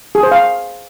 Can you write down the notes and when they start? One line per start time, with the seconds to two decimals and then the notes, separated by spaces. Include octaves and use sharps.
0.15 G#4
0.23 C5
0.31 F5